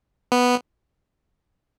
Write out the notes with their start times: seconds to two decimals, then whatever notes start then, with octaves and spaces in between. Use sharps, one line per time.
0.32 B3